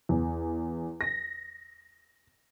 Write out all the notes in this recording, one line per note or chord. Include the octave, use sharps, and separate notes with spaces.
E2
A#6